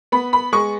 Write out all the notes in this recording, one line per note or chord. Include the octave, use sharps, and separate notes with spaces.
B3 B5
B5
G#3 C#6